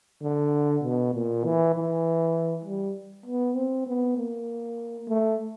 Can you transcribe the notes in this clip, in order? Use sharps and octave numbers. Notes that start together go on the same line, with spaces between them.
D3
B2
A#2
E3
E3
G3
B3
C4
B3
A#3
A3